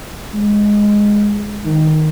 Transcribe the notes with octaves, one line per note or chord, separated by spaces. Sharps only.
G#3
D#3